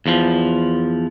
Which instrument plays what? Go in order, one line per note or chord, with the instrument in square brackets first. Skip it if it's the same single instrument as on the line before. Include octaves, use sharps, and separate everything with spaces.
[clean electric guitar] E2 F3